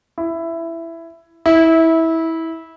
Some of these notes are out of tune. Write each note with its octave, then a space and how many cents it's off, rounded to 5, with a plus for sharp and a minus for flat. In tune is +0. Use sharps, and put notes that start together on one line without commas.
E4 +10
E4 -20